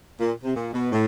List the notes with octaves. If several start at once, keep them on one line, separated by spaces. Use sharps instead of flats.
A#2
C3
A#2
B2
A2